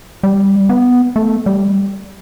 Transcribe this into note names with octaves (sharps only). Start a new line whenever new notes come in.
G3
B3
A3
G3